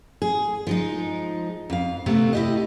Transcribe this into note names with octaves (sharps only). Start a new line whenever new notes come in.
G#4
F3 G#3 D#4
F2 F5
C3 A3 B3 C4
E4 G4 D#5